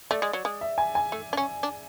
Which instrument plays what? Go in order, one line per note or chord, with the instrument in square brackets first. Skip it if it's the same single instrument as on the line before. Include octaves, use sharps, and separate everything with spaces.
[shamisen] A3 [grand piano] D5
[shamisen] G#3
F#3
G#3
[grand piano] E5
G#5
G#5
[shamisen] A3
D4
C#4
D4